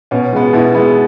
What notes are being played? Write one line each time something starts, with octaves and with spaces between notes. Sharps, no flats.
B2 C#4
G#3 B3
B2 E4
G#3 B3